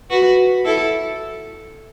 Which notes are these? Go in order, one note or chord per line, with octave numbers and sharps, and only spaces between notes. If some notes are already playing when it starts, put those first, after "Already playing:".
F#4 B4
E4 A4